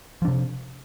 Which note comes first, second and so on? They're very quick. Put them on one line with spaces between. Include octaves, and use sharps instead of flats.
F3 D4 C3